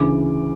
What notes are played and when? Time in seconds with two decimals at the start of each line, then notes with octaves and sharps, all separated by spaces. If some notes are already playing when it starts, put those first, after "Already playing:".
Already playing: D2 C#3 E3 D6